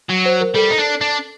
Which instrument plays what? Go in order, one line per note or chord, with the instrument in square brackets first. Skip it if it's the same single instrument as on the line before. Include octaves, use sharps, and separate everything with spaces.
[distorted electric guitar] F#3
[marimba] C5
A#4
[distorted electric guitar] G3 [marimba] A4
[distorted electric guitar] D#4
D4
D4